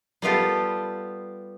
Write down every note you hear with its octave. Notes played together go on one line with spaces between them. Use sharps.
G3 B3 F4 G4 A4